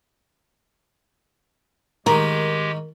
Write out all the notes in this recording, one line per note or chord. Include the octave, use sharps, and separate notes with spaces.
G#2 D#3 G#3 G4 A#4